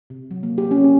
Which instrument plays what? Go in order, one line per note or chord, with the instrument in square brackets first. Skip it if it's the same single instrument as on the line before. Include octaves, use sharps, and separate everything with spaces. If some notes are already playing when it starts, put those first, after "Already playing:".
[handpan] C3
F#3
A#3
G4
C#4
C#4